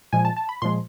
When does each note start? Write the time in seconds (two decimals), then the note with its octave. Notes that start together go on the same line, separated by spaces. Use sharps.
0.13 A#2 F3 G#3 G#5
0.25 A5
0.37 A5
0.49 B5
0.62 A#2 F3 G#3 C6